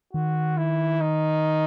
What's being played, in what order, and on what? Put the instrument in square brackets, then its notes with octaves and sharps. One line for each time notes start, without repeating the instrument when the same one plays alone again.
[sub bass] D#3 [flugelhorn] F#4
[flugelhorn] E4
D#4